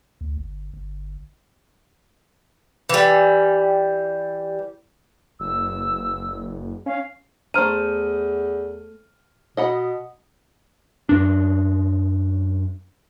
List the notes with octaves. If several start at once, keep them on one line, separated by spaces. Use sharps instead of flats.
D2
G1
G1
E3 G3
F#1 E6
C#4 F5
E2 A3 C5 A#5 F6 D#7
B2 D#5 F#5 B5
F#2 D4